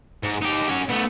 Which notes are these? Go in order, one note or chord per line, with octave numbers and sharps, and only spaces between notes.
G#2
D#4 G4
C#4 F#4
A3 B3